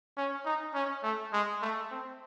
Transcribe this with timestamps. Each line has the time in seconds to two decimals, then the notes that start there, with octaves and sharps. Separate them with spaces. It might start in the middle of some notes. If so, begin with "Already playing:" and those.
0.17 C#4
0.45 D#4
0.74 C#4
1.03 A3
1.33 G#3
1.62 A3
1.91 C4